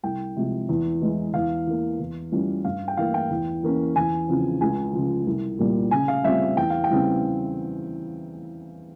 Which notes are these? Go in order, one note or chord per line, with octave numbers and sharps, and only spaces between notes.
C2 G5
C3 F3 G#3
E2
E3 G#3
E2 F5
E3 A#3
E2
E3 G3 C#4 F4
G2 F5
G5
E3 A#3 E4 F5
G5
E2
E3 A#3 C#4
E2 G#5
C#3 F3 C4
C#2 G#5
C#3 F3
C2
A#2 G3 A#3
C#3 G#5
F5
G3 C4 F4 E5
E2 G5
F5
G5
C#3 E3 G3 C4